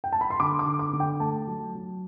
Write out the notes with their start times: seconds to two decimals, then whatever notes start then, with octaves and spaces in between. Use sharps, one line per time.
0.04 G5
0.12 A5
0.21 B5
0.30 C6
0.40 D3 D6
0.59 D6
0.66 D3
0.79 D6
0.93 D3
1.00 G5
1.20 A3 A5
1.47 F#3
1.75 F#3